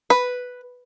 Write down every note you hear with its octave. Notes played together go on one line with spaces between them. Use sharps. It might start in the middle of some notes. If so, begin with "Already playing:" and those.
B4